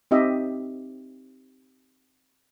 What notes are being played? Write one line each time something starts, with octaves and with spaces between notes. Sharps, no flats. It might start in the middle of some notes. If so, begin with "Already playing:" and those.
C4 D#4 G4 D#5 E5